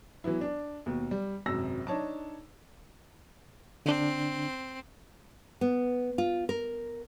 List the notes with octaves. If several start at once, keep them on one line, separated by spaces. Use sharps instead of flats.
E3 F#3 B3 E4
D4
D#2 B2
G3
G#1 F#2 C3 E6 A#6
D4 D#4 C#5 A5 D6
D3 C4 D4
B3
F4
A#4